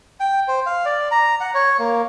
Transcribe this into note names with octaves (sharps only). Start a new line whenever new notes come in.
G5
C5
F5
D5
A#5
F#5
C#5
A#3